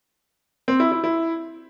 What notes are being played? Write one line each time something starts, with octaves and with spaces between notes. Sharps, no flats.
C4
E4
E4
E4